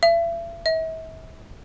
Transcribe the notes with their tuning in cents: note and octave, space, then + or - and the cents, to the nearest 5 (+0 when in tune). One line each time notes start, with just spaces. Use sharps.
E5 +40
E5 -40